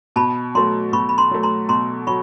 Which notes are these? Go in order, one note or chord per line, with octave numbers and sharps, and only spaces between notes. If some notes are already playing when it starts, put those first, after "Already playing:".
B2 A5 B5
F#3 A3 A#5 C6
B2 B5 C#6
B5
A#5 C6
F#3 A3
A#5 C6
B2 A#5 C6
F#3 B5 C#6